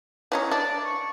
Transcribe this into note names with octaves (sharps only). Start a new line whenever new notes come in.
E3 C#4 D#4
D4 D5
C#6